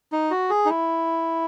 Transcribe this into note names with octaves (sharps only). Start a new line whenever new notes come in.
D#4
F#4
G#4
D#4
E4